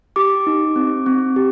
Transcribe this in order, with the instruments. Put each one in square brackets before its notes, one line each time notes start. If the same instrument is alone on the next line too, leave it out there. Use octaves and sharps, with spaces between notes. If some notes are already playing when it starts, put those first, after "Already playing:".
[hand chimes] G4 D6
D#4
C4
C4
G4